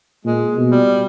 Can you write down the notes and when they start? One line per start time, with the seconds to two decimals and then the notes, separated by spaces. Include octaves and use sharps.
0.25 A#2 G#3
0.56 B2
0.71 G3